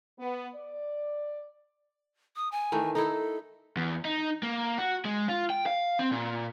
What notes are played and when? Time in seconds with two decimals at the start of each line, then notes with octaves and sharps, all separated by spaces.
0.18 B3
0.55 D5
2.36 D#6
2.52 G#5
2.72 D#3 E3 A3
2.95 D#4 E4 A4
3.77 E2
4.05 D#4
4.43 A#3
4.78 F#4
5.05 G#3
5.29 F4
5.50 G5
5.66 F5
5.99 C4
6.11 A#2